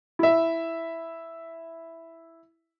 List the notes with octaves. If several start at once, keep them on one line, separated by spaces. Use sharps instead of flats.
E4 E5